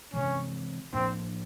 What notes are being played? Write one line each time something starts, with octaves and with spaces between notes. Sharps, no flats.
C3 E3 G#3 C#4
A2 F3 A#3 C4 D4